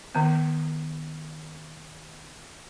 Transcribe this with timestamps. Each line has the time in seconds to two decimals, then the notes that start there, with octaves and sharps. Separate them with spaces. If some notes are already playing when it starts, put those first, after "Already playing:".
0.15 D#3 B3